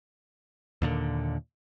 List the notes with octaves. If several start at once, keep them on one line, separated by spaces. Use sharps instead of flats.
D#2 A#2 D3